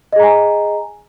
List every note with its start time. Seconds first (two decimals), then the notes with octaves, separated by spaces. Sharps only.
0.13 D#5
0.16 G#4
0.20 A#5
0.23 G#5